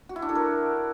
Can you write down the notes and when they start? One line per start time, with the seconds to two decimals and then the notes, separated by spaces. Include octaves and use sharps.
0.09 F#4
0.16 E4
0.22 D4
0.29 A4
0.35 A#4